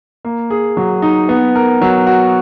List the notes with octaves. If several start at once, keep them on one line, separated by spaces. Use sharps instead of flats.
A#3
G#4
F#3
D#4
B3
A#4
F#3
F#4